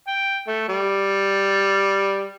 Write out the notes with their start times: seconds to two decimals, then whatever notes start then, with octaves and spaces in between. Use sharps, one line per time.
0.07 G5
0.47 A3
0.68 G3